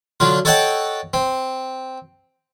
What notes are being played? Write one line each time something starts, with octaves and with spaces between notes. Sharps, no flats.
D3 F#3 F4
A4 C#5 D#5 F#5 G5 A5
C4